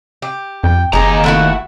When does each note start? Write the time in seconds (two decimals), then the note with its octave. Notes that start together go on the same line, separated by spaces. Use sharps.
0.22 G4
0.64 F2 G5
0.93 F#1 D#2 D#4 G4 G#4 A#5
1.24 A3 E4 F#4 F#5